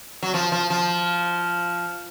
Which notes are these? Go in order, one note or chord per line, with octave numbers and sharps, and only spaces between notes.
F#3
F3
F3
F3